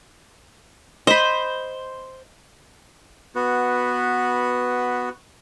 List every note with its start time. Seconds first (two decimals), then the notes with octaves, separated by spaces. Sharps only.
1.07 C5 D#5 B5
3.35 B3 F#4 B4